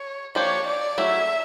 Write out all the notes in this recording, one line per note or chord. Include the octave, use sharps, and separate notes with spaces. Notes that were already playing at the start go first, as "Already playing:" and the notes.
Already playing: C#5
F3 A#3 D4 G4 C#5
D5
F#3 A3 C#4 E4 G#4 E5